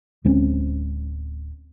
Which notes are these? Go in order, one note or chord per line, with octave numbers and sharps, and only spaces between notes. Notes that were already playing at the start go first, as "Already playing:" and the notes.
D1 G#3 C4 C#4